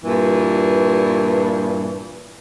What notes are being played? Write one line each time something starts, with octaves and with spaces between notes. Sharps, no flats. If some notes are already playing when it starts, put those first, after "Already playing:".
G2 A#2 E3